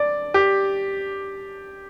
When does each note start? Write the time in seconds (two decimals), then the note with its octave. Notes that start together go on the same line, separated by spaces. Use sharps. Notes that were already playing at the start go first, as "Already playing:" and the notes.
Already playing: D5
0.34 G4